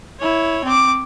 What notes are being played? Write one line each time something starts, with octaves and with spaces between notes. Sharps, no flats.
E4 C#5
C4 D6